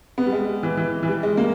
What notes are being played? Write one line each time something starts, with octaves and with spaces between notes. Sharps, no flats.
B3
G3
G#3
E3
E3
E3
G3
G#3
A#3